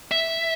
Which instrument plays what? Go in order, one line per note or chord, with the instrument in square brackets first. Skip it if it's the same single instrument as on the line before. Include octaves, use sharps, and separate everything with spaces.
[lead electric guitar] E5